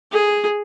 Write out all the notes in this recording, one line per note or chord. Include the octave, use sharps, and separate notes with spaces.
G#4